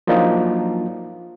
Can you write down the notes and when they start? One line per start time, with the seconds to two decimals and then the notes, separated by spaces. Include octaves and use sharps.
0.07 F3 F#3 A#3 D4 D#4 F4